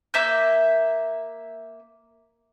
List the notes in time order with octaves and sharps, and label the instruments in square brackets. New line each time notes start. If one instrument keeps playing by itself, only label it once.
[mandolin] A#3 E5 G6